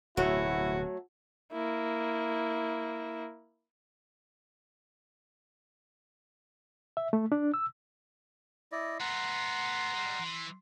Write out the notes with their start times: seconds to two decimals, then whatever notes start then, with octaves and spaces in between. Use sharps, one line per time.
0.17 D1 B2 F#3 A3 E4 F#4
1.53 A#3 E4
6.97 E5
7.13 A3
7.32 D4
7.54 E6
8.72 E4 D5 D#5
9.00 A3 B3 F#5 A#5 C6
9.94 G3 G#3
10.19 E3